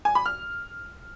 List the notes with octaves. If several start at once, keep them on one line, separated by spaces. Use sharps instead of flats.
G#5
B5
F6